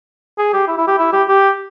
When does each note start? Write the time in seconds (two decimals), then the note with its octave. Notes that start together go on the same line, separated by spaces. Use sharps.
0.38 G#4
0.53 G4
0.68 E4
0.78 E4
0.87 G4
0.98 E4
1.13 G4
1.28 G4